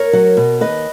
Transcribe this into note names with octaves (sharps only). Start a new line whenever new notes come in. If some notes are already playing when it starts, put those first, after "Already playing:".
Already playing: A#4 C#5
F#3
B2
D#2 B4 D#5